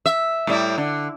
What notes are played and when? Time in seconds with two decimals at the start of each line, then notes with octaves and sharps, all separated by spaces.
0.06 E5
0.47 A2 G3 E4
0.78 D3